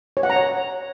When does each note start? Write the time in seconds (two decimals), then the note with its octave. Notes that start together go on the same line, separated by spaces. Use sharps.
0.17 C#5
0.23 F#5
0.30 A#5
0.36 C#5